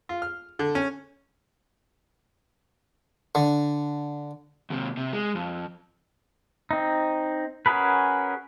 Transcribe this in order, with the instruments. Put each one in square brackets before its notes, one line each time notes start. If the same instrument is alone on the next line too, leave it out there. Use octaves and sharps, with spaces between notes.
[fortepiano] F4
F6
D3
C#4
[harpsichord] D3
[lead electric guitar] D#2 C3
C3
G#3
F2
[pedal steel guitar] C4 D#4
C#4 F#4 G#4 A#4 B4